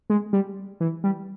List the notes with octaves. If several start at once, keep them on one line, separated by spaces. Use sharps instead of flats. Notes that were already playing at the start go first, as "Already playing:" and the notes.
G#3
G3
E3
G3